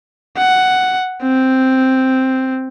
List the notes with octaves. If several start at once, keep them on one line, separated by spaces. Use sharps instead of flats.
F#5
C4